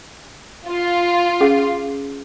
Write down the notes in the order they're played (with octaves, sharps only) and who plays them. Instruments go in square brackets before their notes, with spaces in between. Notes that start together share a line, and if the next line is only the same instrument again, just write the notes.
[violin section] F4
[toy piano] C#4 G#4 F#5